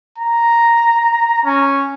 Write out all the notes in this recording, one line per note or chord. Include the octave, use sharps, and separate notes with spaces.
A#5
C#4